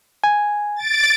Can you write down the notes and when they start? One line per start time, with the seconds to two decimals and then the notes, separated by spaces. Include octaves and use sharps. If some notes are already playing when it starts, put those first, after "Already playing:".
0.24 G#5
0.76 A6 D7